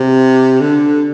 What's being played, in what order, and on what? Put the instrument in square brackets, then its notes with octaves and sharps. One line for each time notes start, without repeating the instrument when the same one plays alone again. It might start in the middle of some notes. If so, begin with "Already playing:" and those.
Already playing: [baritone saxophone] C3
D3